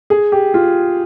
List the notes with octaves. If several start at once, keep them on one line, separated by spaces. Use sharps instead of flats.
G#4
G4
F4